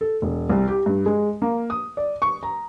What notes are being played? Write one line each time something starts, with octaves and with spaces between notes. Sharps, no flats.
A4
E1
C2
G4
G2
G#3
A#3
D#6
D5
C#6
A#5